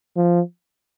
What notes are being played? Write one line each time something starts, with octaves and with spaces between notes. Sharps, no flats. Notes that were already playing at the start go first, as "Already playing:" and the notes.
F3